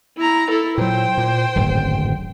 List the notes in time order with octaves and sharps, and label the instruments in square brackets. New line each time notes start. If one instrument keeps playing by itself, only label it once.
[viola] E4 A#5
E4 A4
[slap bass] A#2 F#3 [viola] C5 G5
[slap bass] A#2
D1 G#1 F#2